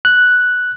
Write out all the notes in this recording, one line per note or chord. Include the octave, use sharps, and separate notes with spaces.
F#6